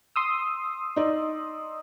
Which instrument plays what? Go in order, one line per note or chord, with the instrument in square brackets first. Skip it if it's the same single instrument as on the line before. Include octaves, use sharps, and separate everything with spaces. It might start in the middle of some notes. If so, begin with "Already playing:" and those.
[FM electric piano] C6 D#6 E6
[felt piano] D#4 D5